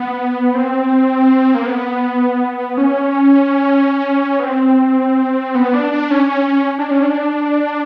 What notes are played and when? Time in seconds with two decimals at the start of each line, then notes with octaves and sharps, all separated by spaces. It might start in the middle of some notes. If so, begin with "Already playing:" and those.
Already playing: B3
0.55 C4
1.54 A#3
1.66 B3
2.78 C#4
4.39 B3
4.44 C4
5.55 B3
5.74 D4
5.92 D4
6.11 C#4
6.29 C#4
6.48 C#4
6.78 D4
6.91 C#4
7.03 D4